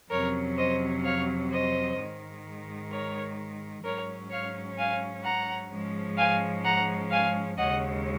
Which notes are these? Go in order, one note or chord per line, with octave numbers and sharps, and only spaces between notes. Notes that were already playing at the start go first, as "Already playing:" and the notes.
F2 C3 F#3 C#4 A#4 C#5
C5 D#5
C#5 F5
C5 D#5
G#2 D#3 G#3
A#4 C#5
G#2 F#3 C#4 A#4 C#5
C#5 F5
F5 G#5
F#5 A#5
G#2 F3 G#3 C#4
F5 G#5
F#5 A#5
F5 G#5
D#2 C#3 G#3 C#4 D#5 F#5